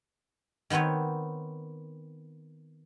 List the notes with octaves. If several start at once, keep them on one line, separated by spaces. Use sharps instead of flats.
D#3 B3 C4 B4 C#5